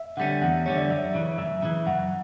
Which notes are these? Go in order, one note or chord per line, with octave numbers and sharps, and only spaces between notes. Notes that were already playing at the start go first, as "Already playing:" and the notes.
Already playing: E5
D3 G3 C#4 F#5
E2 F#5
E5
D3 G3 C#4 C#5
D5
F#2 E5
C#3 E3
F#2 E5
C#3 E3
F#2 F#5